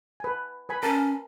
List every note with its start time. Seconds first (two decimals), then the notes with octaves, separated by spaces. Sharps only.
0.20 B4 G#5
0.69 B4 G#5 B5
0.83 C#4 A#4 A5